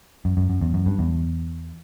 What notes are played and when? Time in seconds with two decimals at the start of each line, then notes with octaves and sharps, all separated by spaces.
0.25 F#2
0.37 F#2
0.50 F#2
0.61 E2
0.74 F#2
0.86 G2
0.99 E2